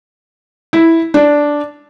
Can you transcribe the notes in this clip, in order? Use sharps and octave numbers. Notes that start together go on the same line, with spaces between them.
E4
D4